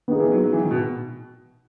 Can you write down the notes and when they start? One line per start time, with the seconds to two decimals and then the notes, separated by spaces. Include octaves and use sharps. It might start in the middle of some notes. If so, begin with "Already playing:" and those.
0.08 D#3 B3 D#4 G#4
0.20 E3
0.32 F#3
0.44 F#3
0.53 E3
0.62 D#3
0.71 B2